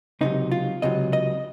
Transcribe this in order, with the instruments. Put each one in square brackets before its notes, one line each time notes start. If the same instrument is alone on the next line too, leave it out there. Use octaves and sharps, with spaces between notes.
[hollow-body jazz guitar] C#2 C3 F#3 D#4
F4
C#2 C3 F#3 D#5
D#5